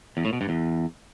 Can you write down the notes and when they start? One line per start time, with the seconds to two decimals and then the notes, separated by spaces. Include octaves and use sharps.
0.17 E2
0.25 A2
0.33 B2
0.41 G2
0.49 E2